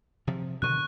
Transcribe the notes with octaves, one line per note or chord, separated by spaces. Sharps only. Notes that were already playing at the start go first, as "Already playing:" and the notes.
C3 F3
B2 D3 D#3 C#6 F#6